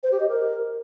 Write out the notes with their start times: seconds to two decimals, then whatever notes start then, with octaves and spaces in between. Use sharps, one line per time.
0.03 C5
0.12 G4
0.20 D#5
0.29 A#4